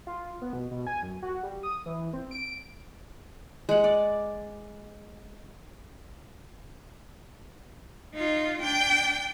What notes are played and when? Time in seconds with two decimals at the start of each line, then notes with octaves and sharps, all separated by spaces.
0.07 F4
0.42 B3
0.53 B2
0.71 B2
0.87 G#5
1.03 F#2
1.23 F#4
1.43 G3
1.63 D#6
1.86 E3
2.13 C4
2.31 D7
3.69 G#3 F#5
3.84 D5
8.14 D#4 F4
8.62 D4 G5